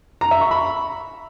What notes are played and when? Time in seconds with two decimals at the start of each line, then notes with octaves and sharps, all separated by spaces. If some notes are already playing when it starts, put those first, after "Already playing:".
0.21 A#5
0.31 E5
0.41 C#6
0.51 B5